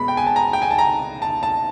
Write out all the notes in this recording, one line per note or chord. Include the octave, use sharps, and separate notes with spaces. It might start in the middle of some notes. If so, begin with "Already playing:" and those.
Already playing: B2 G#3 B3 B5
G5
G#5
A5
A#5
G5
G#5
A5
A#5
A5
A5